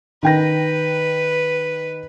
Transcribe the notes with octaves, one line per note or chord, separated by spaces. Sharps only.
D#3 B4 G5 A#6